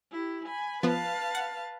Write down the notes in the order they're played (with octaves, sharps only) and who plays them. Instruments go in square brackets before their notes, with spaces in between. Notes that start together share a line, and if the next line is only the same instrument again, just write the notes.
[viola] E4 G4
G#5 B5
[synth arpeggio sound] F3 B3 [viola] B4 F5 [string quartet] A5
[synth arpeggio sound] F#5